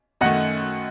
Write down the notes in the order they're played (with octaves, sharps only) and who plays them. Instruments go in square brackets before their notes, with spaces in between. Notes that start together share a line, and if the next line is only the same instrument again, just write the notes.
[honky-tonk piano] F#2 D#3 A3 [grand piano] D#5 F#5